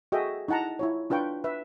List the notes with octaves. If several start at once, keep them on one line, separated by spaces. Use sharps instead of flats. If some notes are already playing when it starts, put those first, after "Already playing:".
F#4 G#4 A4 D#5 E5 G5
D#4 E4 F#5 A5 A#5
E4 F4 C#5
D4 F4 B4 G5 C#6
B4 E5